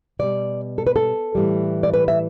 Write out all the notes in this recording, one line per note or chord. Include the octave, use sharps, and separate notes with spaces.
B2 G3 D5
A4
B4
A4
A2 E3 G3
D5
B4
E5